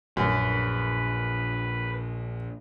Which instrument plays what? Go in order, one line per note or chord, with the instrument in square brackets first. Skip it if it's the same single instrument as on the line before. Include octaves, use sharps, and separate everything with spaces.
[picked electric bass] A#1 [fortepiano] F#2 [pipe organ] B4